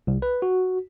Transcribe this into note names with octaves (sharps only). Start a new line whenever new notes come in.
C2
B4
F#4